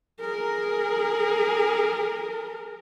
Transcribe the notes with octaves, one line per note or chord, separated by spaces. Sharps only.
G#4 A#4